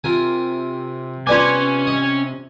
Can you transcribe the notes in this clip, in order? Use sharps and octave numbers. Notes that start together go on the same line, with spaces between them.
C3 F4 A#4 G#5
B3 C#4 F4 B4 C5 D5 G#5 D6
D#5